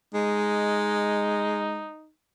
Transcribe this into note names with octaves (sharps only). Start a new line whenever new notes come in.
G#3 D#4